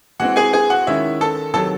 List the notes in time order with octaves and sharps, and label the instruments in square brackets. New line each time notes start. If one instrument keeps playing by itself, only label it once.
[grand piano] E3 G#3 C4 F#4 F#5
G#4 G#5
G#4 G#5
F#4 F#5
D#3 G#3 C#4 E4 E5
A4 A5
C3 D#3 F#3 A4 A5